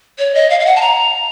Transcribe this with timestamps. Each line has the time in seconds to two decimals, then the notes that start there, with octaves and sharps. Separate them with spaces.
0.19 C#5
0.35 D#5
0.50 F5
0.60 F5
0.66 F#5
0.76 A5
0.81 A#5